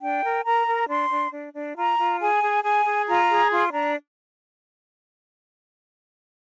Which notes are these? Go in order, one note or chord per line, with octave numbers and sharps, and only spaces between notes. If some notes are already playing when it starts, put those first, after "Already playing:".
D4 G5
A#4
A#4 A#5
A#4
D4 C6
D4
D4
D4
F4 A#5
F4
G#4 G#5
G#4
G#4 G#5
G#4
F4 A#5
G#4
F4 C6
D4 A#5